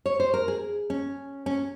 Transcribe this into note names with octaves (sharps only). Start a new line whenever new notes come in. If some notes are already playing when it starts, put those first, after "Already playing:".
C#5
C5
A#4
G#4
C#4
C#4